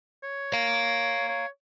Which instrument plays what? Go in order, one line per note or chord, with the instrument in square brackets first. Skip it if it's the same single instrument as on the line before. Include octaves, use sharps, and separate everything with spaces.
[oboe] C#5
[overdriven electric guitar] F5 A#5
[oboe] C#5